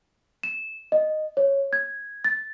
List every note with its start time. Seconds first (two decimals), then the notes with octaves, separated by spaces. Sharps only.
0.43 E7
0.92 D#5
1.37 C#5
1.73 G#6
2.25 A6